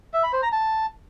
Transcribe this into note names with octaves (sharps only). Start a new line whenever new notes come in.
E5
B5
C5
A#5
A5